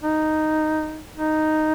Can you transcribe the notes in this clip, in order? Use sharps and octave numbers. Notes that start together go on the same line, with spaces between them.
D#4
D#4